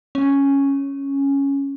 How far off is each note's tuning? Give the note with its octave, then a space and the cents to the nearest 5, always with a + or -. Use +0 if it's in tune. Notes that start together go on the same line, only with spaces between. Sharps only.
C#4 +0